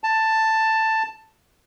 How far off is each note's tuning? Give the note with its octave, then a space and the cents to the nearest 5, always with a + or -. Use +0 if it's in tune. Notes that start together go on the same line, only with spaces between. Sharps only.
A5 +10